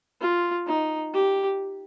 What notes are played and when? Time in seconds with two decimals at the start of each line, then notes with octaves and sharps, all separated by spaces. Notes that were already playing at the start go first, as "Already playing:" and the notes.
0.21 F4
0.66 D#4
1.13 G4